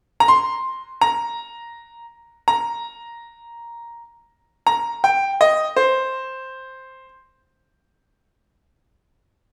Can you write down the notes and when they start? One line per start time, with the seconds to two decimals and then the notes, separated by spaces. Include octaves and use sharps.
0.20 A#5
0.28 C6
1.01 A#5
2.48 A#5
4.67 A#5
5.04 G5
5.41 D#5
5.76 C5